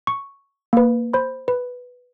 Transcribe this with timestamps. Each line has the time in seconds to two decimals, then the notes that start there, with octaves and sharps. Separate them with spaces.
0.07 C#6
0.73 A#3 B4
1.13 C5 B5
1.48 B4